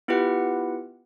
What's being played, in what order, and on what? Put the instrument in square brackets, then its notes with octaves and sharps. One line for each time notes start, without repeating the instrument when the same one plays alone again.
[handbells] B3 E4 F4 G4 B4 F#5